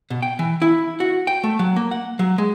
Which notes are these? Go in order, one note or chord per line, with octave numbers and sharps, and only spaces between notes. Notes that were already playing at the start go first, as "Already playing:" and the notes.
B2
G5
E3
E4
F#4
G5
A3
F#3
A#3
F#5
F#3
G#3